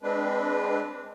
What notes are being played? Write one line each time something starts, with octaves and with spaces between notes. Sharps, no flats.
G#3 C4 D4 B4